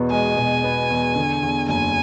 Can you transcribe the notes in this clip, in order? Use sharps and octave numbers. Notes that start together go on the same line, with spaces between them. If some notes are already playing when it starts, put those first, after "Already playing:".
Already playing: E2 B2 B3
G#3 G#5
B2
B3
E2
D3
E2
F#1 G#5